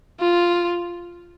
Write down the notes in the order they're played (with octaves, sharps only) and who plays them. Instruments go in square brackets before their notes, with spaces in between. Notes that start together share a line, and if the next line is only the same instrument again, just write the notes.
[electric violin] F4